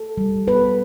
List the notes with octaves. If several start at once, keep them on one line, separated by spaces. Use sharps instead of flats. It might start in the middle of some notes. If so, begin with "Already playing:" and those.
Already playing: A4
G3
B3 B4